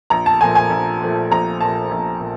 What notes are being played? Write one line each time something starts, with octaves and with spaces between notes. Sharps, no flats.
A#1 A#5
A5
A#2 F3 A3 G#5
G#5
A#1
A#2 F3 A3
A#1 A#5
A#2 F3 A3 A5
A#1
A#2 F3